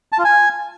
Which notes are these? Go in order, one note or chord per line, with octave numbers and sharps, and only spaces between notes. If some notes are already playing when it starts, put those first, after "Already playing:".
A5
F4
G#5